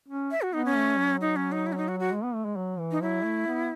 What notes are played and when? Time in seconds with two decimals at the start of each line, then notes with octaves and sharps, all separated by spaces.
0.08 C#4
0.31 E5
0.42 F#4
0.53 B3 D#4
0.65 C#4
0.76 A3
0.98 F#3
1.21 D#4
1.36 C#4
1.52 D#4
1.67 E4
1.73 C#4
1.77 D#4
1.88 F#4
2.00 F#4
2.12 G#3
2.23 B3
2.34 A3
2.45 G#3
2.56 F#3
2.79 E3
2.91 D#4
3.02 F#3 E4
3.24 A3
3.47 B3